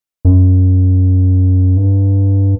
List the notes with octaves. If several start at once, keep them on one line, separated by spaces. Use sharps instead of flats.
F#2
G2